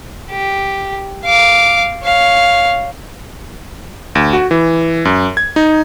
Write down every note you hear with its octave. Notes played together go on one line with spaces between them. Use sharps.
G4
F5 D6
C#5 F5
D2
F#4
E3
F#2
G#6
D#4